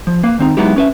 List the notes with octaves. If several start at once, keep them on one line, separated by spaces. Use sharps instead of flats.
F3
A#3 B4 F5
D#3 C4 D#4
F#3 G#3 B3 D#4 E4 G4
C#4 B4 E5